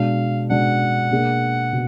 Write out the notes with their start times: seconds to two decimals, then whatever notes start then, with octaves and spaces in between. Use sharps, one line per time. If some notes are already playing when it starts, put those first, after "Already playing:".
Already playing: B2 G#3 D4 F5
0.50 B2 G#3 D4 F#5
1.11 B2 A#3 D4 G#4
1.73 B2